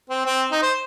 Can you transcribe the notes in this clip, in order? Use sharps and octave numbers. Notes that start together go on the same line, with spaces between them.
C4
C4
D#4
C5